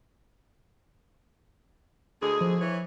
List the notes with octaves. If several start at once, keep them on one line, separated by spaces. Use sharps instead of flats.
D2 G#3 G#4
F3
E3 C#5